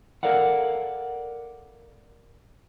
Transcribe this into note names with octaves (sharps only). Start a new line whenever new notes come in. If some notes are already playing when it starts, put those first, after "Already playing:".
A4 A#4 D5 F5 F#5